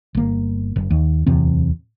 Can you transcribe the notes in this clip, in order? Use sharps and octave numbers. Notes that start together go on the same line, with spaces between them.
G1 A#3
F#1
D#2
D1 E2 C3 C4